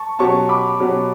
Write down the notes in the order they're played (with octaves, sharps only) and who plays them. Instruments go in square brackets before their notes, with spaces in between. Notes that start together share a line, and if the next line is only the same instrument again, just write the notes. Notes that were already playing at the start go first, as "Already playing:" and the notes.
Already playing: [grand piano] A5 C#6
[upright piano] B2 F#3 C#4 G4 [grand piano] A5 C#6
[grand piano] B5 D6
[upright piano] B2 F#3 C#4 G4